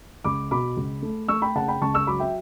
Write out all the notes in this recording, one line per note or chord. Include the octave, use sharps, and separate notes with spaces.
C#2 B5 D6
B2 B5 D6
C#2
A3
A3 C#6 E6
G5 B5
C#3 F#5 A5
G5 B5
C#2 A5 C#6
C#6 E6
F#3 B5 D6
E5 G5